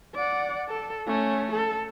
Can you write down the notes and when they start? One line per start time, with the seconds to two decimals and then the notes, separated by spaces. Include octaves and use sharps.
0.15 D5 F#5
0.68 A4
1.07 A3 C#4
1.52 A4